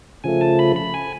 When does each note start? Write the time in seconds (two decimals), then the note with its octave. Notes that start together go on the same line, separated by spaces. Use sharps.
0.24 C#3 F3 A3 G#5
0.41 A5
0.59 B5
0.76 B5
0.94 G#5